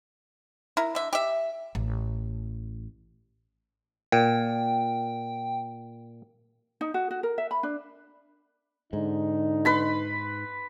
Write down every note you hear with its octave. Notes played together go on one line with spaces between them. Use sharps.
E4 A#4
D3 E5
G4 E5
A1
A#2 G5
D#4
F#4
F#4
A#4
E5
B5
D4
G#2 D3 D#4
B4 B5 C6